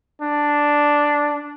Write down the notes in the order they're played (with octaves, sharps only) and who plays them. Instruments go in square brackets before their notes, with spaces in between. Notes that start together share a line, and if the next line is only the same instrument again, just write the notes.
[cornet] D4